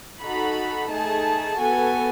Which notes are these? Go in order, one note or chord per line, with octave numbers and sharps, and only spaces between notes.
D#4 F#4 A4 B5
A3 D#4 G#4 A5
B3 F#4 A4 G#5